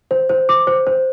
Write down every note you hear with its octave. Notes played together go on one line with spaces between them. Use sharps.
C5
C5
D6
C5
C5